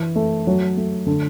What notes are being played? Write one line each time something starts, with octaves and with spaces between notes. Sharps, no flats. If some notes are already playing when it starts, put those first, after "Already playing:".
Already playing: E3
A3
F#3
A3
D3